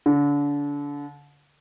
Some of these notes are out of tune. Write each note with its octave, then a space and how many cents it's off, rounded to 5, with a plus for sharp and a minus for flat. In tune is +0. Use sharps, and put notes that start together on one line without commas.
D3 -30